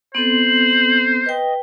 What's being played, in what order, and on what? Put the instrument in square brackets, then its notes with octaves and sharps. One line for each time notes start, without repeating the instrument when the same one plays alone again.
[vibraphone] B3 C4 A4 [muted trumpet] C5 [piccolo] F#7
[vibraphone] B4 G5 [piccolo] D#5